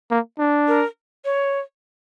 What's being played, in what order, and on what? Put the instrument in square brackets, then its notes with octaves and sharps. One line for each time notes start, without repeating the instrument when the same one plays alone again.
[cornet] A#3
D4
[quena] A#4
C#5